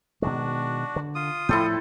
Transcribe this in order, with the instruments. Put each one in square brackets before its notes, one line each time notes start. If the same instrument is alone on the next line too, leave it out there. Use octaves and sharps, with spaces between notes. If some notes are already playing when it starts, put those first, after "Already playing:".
[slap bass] B2 D#3 G#3 [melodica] D4 F#4
[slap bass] D3
[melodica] F4 D#6
[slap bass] A2 F3 [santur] E4 A4 C5